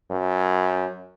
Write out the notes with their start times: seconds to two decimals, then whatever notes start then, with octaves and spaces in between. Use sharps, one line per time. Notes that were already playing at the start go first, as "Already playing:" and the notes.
0.11 F#2